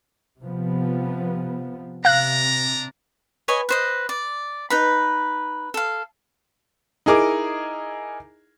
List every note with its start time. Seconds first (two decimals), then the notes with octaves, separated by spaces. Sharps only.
0.39 C3 F3 B3
2.05 C3 D4 F5 A#5 F#6
3.48 B4 C#5 D#5 G#5
3.69 B4 C5 D#5
4.09 D5
4.70 D#4 B4 B5
5.74 A4 F5
7.06 D#4 E4 G#4 A#4 D6